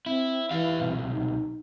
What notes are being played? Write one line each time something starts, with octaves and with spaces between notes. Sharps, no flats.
C4 E4
E3 G4 F5
B1 C3
D#4